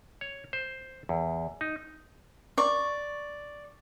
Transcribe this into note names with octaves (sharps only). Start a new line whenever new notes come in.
C#5
C5
E2
D#4
D5 C#6